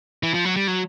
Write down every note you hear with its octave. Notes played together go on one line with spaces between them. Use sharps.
E3
F3
F#3
G3
F#3